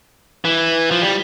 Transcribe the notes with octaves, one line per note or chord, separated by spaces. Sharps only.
E3
F3
G3